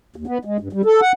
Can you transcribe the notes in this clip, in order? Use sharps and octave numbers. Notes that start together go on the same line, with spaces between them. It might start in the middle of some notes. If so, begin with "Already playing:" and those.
D#2
B3
G#3
G2
G3
A4
F#5